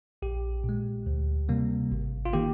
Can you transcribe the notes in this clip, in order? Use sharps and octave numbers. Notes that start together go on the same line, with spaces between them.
A#1 G4
A#2
G#3
D2
C3 G3 A#3
G#1
F4
D#3 A#3 G4